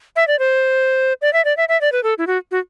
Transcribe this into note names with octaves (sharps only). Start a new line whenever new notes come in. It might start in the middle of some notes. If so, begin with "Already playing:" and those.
E5
D5
C5
D5
E5
D5
E5
E5
D5
B4
A4
E4
F#4
F#4